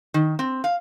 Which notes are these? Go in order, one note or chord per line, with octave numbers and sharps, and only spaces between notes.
D#3
C4
F5